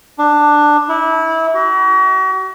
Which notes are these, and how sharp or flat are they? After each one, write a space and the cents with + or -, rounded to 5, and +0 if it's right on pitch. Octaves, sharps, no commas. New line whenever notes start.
D4 +10
E4 -25
F#4 +40